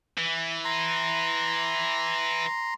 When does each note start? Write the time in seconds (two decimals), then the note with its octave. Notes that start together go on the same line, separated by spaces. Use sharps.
0.17 E3
0.65 A#5 C6